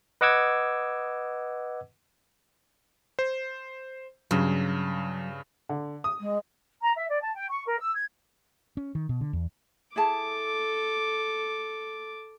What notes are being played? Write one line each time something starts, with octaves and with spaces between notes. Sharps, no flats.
B4 D#5 F#5 D6 E6 G#6
C5
G2 C#3 F#3
D3
D#6
G#3
A#5
E5
D5
A5
G5
C#6
A#4
E6
G#6
C#4
D#3
B2
D3
E2
E4 G#4 A4 A5 D6